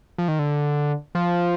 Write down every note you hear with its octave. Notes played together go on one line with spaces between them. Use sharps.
F3
D#3
D3
F3